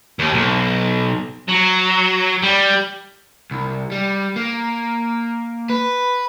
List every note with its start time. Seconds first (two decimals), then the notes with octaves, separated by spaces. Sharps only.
0.19 D#2
0.34 B1
1.49 F#3
2.43 G3
3.51 C2
3.92 G3
4.36 A#3
5.70 B4